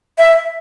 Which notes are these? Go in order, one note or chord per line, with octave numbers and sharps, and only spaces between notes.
E5